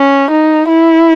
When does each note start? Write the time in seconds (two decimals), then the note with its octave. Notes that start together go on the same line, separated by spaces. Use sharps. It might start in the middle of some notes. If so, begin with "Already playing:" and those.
Already playing: C#4
0.31 D#4
0.68 E4